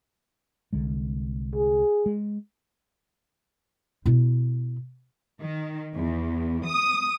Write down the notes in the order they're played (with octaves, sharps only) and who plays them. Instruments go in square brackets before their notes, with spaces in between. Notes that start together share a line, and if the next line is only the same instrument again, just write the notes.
[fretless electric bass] C2 D3 G#3
[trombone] G#4
[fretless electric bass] G#3
[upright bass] B2 E4
[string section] D#3
E2
D#6